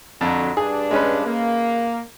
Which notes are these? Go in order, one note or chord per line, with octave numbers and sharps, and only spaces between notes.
F2 D3 F#3
G2 D4 G#4
G#3 C#4 B4
A#3